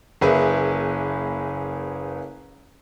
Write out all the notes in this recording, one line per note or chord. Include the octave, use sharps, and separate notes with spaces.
F#1 A#3 G#4 B4 E5 G#5